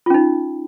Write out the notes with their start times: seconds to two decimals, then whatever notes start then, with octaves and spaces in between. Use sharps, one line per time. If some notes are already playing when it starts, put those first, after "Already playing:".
0.06 F4
0.10 C#4
0.14 D#4